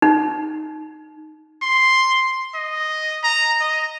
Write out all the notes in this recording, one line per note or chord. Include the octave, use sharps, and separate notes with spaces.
D#4
C6
D#5
A#5
D#5